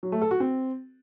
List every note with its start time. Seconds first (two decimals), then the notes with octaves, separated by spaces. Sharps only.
0.03 F#3
0.12 A3
0.22 A4
0.31 F#4
0.40 C4